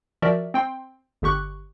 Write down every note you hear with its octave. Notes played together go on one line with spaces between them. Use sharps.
F3 F#4 A#4 D5 E5
C4 G5 C6
G1 D3 G4 C#6 F#6